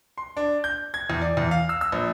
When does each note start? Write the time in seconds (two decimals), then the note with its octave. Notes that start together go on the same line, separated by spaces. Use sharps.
0.18 C6
0.37 D4
0.64 G6
0.94 G#6
1.10 E2
1.21 D5
1.37 E2
1.51 F5
1.69 E6
1.81 E6
1.92 A#1